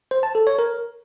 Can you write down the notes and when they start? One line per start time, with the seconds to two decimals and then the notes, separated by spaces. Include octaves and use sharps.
0.11 C5
0.23 A5
0.35 A4
0.47 C#5
0.59 A#4